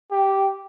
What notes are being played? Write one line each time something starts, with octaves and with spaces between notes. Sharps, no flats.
G4